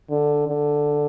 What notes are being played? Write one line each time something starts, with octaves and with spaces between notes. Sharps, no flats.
D3
D3